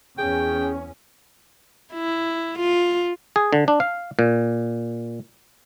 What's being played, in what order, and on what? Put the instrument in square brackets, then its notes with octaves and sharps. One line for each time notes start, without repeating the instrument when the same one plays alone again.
[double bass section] E2 C#4 [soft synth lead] G#4 [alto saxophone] G5
[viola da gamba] E4
F4
[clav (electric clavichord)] G#4
D3
D4
F5
A#2